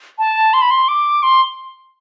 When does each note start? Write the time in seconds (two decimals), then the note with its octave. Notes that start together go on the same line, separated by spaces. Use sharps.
0.18 A5
0.53 C6
0.61 B5
0.70 C6
0.88 D6
1.23 C6